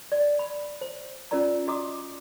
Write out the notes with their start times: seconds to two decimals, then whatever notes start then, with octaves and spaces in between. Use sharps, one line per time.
0.12 D5
0.39 B5
0.81 C5
1.31 C#4 F4 A#4 D5 A#5
1.67 F#4 D#5 A#5 D6 D#6